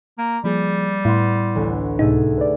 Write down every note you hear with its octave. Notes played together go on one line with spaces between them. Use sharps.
A#3
F3 G3 A#3 G#4
A2 B3 E4 C6
A1 D2
C#2 A2 C3 A3 D#4 G#4
B4 D5